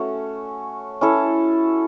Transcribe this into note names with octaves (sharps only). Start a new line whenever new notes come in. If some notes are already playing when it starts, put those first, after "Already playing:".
Already playing: A3 C#4 F#4
C#4 E4 A4